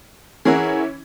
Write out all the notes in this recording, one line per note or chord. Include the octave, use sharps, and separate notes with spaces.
E3 C#4 E4 G#4 A#4 F#5